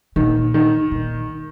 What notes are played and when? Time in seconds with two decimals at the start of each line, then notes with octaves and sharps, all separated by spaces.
0.16 A#2 D#3
0.54 D#3
0.91 A#2